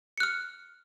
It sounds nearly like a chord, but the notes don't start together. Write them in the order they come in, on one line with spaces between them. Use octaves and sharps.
C#7 F#6 F6